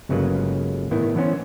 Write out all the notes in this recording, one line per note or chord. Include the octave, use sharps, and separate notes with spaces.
G1 C#3 F#3 G#3 A#3 B4
A2 D#3 B3 E4
E3 B3 C#4 C5